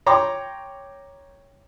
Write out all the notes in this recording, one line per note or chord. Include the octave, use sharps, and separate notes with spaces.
C#5 G5 A#5 C6 D6